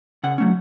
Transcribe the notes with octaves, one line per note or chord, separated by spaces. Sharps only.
C#3 F#5
F#3 A3 C#4